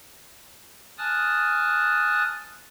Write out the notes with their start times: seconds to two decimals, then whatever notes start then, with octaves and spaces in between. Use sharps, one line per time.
0.98 G#5 A5 D#6 F6 F#6 A6